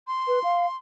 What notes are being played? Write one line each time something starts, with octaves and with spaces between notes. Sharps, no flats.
C6
B4
F5